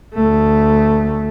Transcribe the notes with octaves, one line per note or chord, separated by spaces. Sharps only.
D2 A3